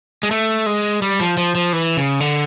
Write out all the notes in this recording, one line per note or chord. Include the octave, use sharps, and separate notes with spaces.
G#3
A3
G#3
G3
F3
F3
F3
E3
C#3
D3